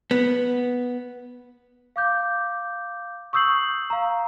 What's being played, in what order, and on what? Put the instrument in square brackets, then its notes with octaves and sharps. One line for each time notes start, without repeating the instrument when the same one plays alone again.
[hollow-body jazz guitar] B3
[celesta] F5 D6 G6
C#6 D#6 E6 G6 C7 F#7
F5 A#5